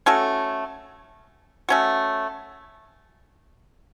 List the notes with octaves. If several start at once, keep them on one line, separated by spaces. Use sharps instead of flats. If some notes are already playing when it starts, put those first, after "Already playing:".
A3 C#4 F#4 A4
A3 C#4 F#4